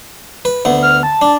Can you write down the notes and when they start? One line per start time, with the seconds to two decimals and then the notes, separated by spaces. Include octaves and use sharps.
0.45 B4
0.65 D2 B3
0.82 F6
1.03 A5
1.22 D4